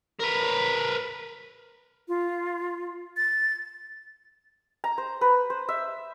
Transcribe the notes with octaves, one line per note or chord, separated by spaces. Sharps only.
A#4 B4
F4
A6
A#5
C5
B4
C5
E5